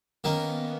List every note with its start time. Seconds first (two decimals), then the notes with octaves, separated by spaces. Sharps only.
0.24 D#3 A#3 B3 C#4